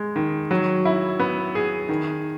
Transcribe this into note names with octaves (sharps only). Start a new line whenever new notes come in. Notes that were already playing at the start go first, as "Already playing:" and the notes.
Already playing: G#3
D#3
F#3
E4
B3
G#4
D#3